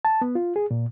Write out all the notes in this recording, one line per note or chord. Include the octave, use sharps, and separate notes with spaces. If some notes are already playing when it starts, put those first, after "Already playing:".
A5
B3
F4
G#4
A#2